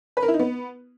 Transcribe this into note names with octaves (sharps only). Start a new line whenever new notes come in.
B4
A#4
E4
D#4
B3